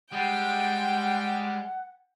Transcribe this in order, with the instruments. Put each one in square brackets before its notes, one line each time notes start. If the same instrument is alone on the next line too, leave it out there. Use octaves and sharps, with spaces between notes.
[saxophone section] G3 [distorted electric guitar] G#3 [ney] F#5 [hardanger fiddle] G5